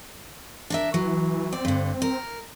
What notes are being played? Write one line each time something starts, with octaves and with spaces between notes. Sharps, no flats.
D4 A#4 E5
E3 F#3
C4 D5
G2 D3
A#4